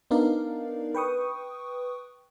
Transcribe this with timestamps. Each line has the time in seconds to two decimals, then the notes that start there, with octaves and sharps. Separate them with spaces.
0.11 B3 D4 D#4 A#4 D5 F5
0.95 B4 G5 C#6 D#6